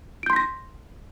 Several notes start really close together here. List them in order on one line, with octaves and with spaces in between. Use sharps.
D7 G6 C6 B6 A#6